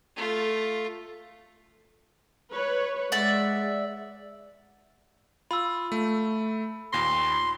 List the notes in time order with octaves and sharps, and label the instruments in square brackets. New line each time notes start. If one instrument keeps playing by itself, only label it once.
[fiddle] A3 F4
[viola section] B4 C#5
[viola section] G#3 [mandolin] D5 E5 F#5
[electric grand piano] F4 [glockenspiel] B5 E6
[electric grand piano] A3
[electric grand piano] D#2 A#2 A#6 [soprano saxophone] C6